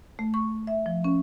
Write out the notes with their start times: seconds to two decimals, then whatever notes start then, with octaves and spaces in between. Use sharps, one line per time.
0.19 A3
0.34 C#6
0.67 E5
0.86 F3
1.04 C#4